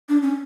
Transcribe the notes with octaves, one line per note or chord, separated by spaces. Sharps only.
D4
C#4